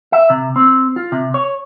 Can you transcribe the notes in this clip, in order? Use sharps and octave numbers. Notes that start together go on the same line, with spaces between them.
E5
C3
C4
F4
C3
C#5